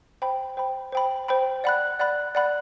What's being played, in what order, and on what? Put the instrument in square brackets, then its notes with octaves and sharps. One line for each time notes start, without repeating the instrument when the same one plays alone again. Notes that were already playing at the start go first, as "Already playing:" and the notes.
[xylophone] C5 G5 B5
C5 G5 B5
C5 G5 B5
C5 G5 B5
D5 F#5 B5 F#6
D5 F#5 B5 F#6
D5 F#5 B5 F#6